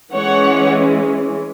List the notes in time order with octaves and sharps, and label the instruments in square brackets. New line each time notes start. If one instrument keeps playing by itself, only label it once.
[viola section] E3 G#3 C#4 C#5 F#5